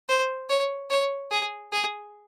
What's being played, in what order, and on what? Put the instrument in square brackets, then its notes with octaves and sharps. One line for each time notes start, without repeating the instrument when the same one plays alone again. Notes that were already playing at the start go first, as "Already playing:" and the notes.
[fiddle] C5
C#5
C#5
G#4
G#4